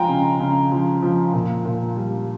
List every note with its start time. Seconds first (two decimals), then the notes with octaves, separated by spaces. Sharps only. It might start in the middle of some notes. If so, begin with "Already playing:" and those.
Already playing: F3 G#3 F5 G5 G#5 A#5
0.09 C#3
0.40 C#3
0.72 F3
1.03 F3
1.33 A#2
1.65 A#2
1.96 G3